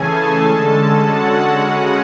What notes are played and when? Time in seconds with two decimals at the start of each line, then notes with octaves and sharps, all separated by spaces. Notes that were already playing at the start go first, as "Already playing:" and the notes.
Already playing: C#3 E3 A3 C#4 G#4 A4 G#5 A5
0.41 D3 G#3 C#4 A4 A5
0.96 F#4 F#5
1.50 C#3 G#3 C#4